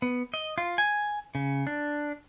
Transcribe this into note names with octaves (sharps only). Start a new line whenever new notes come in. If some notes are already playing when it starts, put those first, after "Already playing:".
B3
D#5
F4
G#5
C#3
D4